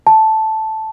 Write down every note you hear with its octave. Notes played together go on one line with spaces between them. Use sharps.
A5